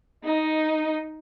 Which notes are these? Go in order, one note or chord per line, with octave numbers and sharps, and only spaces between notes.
D#4 D#5